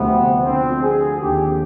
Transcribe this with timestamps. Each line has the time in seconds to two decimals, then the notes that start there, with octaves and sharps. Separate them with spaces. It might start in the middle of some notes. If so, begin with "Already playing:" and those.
Already playing: D2 C3 F3 B3
0.44 D2 D3 F3 C4
0.82 G#4
1.20 D#2 D3 F3 G4